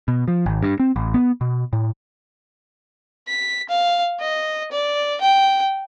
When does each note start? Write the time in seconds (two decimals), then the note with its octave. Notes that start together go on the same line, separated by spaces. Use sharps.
0.08 B2
0.28 F3
0.46 G#1
0.63 G2
0.80 C4
0.96 A1
1.14 B3
1.41 B2
1.73 A2
3.28 B6
3.69 F5
4.21 D#5
4.72 D5
5.21 G5